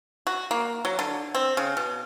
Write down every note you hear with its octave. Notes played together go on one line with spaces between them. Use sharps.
F#4
A#3
F#3
D3
C4
C#3
B2